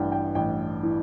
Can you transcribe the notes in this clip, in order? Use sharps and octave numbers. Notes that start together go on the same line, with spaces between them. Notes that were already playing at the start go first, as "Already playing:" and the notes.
Already playing: A1 G2 E3 F#5 G5
G5
A1 G5
E3